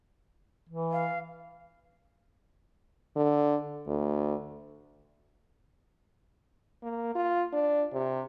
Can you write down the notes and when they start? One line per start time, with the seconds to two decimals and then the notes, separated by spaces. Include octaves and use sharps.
0.69 E3
0.92 F5
3.16 D3
3.87 D2
6.82 A#3
7.15 F4
7.53 D4
7.93 C3